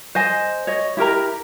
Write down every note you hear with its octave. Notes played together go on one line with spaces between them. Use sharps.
C5 D#5 G#5
C#5 D#5
E4 G4 A#4 A#5